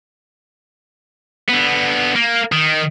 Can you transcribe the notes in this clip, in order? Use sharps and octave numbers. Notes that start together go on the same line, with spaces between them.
D3 B3
A#3
D#3